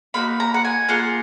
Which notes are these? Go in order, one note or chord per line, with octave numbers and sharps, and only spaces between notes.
A#3 D#4 F#4 B5
A#5
F#5
G#5
A#3 F4 G#4 F#5